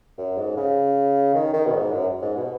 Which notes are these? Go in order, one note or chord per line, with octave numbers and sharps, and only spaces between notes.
F#2
G#2
C#3
D#3
D#3
B2
G#2
F#2
G#2
B2